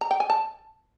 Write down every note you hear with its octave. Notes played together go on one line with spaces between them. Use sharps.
A#5
G5
G#5
A5